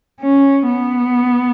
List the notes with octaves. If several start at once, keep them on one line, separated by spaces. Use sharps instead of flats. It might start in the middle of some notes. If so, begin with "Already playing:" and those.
C#4
B3